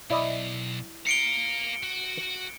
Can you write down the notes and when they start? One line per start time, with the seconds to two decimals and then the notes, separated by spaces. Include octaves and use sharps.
0.10 B1 E4 D5 D#5
1.07 A#4 F5 C#7 D7 G7
1.83 F#4